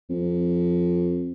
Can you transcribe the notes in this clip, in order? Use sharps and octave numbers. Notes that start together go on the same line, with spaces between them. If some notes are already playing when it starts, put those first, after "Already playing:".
F2